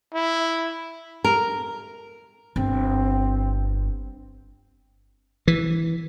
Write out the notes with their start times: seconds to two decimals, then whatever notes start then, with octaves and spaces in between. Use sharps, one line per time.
0.14 E4
1.24 A#4
2.56 G1 C4
5.48 E3